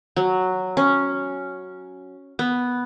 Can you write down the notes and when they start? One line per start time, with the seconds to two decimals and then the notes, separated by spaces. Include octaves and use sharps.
0.17 F#3
0.77 C#4
2.39 B3